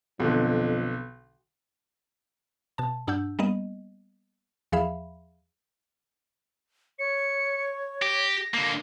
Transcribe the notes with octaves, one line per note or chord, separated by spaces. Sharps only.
B1 F2 D3
B2 A5
G2 D4 F#5 E6 G6
G3 A#3 B3 D#5
E2 F3 G#4 E5 F5 B5
C#5 C#7
G4 A#6
D3 A#3